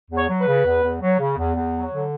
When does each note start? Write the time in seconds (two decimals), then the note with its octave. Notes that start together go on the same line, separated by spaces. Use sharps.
0.11 E2
0.17 C#5
0.29 F#3
0.41 B4
0.47 C#3
0.65 E2
0.83 E2
1.01 F#3
1.19 C#3
1.37 E2
1.55 E2
1.73 F#3
1.92 D3